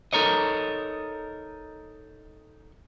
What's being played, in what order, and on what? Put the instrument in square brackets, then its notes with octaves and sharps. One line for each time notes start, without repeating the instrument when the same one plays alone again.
[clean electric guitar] D#4 A4 A#4 C#5 D#5